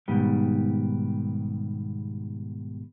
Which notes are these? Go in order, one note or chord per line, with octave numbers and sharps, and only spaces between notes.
G#2 B2 D#3 G3